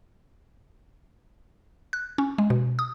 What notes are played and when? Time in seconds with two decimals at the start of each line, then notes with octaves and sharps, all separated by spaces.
1.93 F#6
2.18 C#4
2.38 G#3
2.50 B2
2.79 D#6